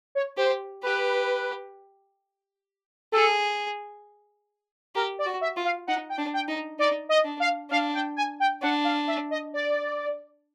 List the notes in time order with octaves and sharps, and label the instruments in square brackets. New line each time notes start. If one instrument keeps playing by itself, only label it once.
[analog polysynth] C#5
[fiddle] G4 [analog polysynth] C5
[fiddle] G4 [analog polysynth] B4
[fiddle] G#4 [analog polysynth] A4
[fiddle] G4 [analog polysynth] A#4
[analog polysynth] D5
[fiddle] F#4
[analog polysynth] E5
[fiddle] F4
[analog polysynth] F5
[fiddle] D#4 [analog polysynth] F#5
[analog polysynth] G5
[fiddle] D4
[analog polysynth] G5
[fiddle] D#4
[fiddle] D#4 [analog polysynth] D5
[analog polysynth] D#5
[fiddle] D4
[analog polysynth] F5
[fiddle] D4 [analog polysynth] F5
[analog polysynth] G5
G#5
G5
[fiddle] D4 [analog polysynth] F#5
[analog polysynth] F5
E5
D#5
D5